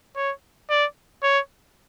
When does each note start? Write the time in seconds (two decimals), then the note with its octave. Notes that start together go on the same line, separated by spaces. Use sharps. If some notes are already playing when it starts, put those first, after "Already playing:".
0.16 C#5
0.70 D5
1.23 C#5